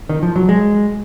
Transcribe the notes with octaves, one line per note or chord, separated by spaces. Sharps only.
D#3
F3
F#3
G#3